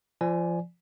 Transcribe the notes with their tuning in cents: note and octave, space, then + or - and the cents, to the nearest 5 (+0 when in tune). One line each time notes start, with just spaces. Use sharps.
F3 -20 D5 +0 G#5 +5